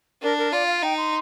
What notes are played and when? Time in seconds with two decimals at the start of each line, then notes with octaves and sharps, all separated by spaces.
0.22 D4 A#4
0.38 A#4
0.53 F4 D5
0.67 F5
0.83 D#4 G5
0.98 C6